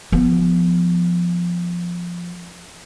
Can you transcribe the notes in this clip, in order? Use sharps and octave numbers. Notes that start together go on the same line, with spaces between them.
F3 B3